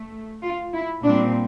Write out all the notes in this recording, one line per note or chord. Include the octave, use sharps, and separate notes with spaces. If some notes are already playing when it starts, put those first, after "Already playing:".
Already playing: A3
F4
E4
A#2 G3 C4 D4